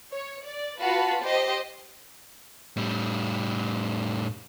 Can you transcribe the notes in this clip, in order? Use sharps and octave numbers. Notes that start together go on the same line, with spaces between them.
C#5
D5
F4 F#4 B4 F5 A5 B5
G4 C5 D#5
A2 G3